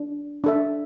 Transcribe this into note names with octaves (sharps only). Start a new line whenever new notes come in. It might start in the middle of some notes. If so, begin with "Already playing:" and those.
Already playing: D4
D4 A4 E5